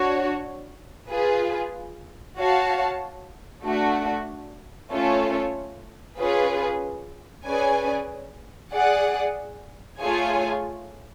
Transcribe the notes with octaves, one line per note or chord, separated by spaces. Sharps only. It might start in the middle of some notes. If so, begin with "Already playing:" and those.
Already playing: D4 F#4 C#5
F4 G#4 B4
F#4 C#5 F5 A5
A3 D4 F#4
A3 C#4 F4 A4 C#5
C#4 F4 G#4 B4
C#4 G#4 B4 D5 G#5
G#4 D5 F#5
A3 F4 G#4 C#5 G#5